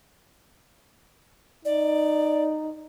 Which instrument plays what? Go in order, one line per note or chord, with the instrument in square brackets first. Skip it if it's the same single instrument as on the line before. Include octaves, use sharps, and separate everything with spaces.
[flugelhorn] D#4 [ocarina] D5